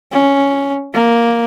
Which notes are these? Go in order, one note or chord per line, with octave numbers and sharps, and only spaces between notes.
C#4
A#3